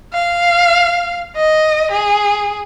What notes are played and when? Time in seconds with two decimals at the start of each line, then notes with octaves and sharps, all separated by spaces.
0.14 F5
1.36 D#5
1.91 G#4